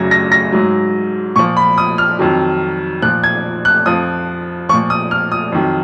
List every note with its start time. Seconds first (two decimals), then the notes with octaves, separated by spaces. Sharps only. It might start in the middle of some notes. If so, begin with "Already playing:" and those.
Already playing: F#2 C#3 F#3 G#6 A#6
0.11 A#6
0.32 A#6
0.52 G#2 F#3
1.36 A#2 F3 C#6
1.57 B5
1.78 D#6
1.98 F6
2.19 F2 D#3 F#3
3.02 A#2 F3 F#6
3.24 G#6
3.65 F#6
3.86 F2 F3 D#6
4.69 F3 C#6
4.73 A#2
4.90 D#6
5.11 F6
5.32 D#6
5.52 F2 D#3 F#3